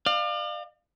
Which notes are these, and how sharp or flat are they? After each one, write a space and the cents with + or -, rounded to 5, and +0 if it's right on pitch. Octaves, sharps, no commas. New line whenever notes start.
D5 +40 F5 +0